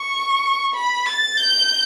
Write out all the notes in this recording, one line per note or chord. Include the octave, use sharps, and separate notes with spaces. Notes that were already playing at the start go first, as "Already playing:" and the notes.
Already playing: C#6
B5
A6
G6